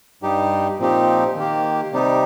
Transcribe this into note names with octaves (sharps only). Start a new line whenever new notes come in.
G2 G3 D#4 G4
A#2 F3 C4 D#4 G4
D#3 A#3 G4
C3 G3 D#4 G4